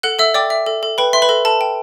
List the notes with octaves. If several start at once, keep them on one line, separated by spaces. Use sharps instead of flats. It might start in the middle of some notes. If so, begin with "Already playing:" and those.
A4 F#5 F#6
A4 E5 E6
D5 G5 D6
E5
A4
A4
B4 G5 B5
E5 C6
B4 B5
A4
A4 A5
G5